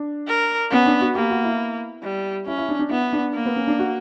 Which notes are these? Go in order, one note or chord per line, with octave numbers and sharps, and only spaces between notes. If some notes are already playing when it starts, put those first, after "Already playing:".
Already playing: D4
A#4
B3 C#4
D4
F#4
A#3 G4
F#4
E4
G3
C#4 E4
E4
D4
D4
B3 E4
D4
A#3
B3
C#4
D4
F#4